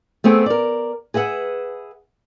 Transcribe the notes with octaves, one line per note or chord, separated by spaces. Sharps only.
A3 B3 C4 G#4
A#4 D5
G#4 B4 E5 F#5